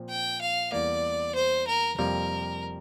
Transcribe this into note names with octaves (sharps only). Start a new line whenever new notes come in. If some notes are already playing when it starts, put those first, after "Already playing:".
Already playing: A#2 F3 C4
G5
F5
E2 E3 G3 A#3 D5
C5
A#4
F2 C3 G3 A#3 A#4